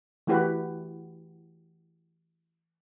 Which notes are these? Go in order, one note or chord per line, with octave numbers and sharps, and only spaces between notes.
E3 A3 E4 F#4 G4 B4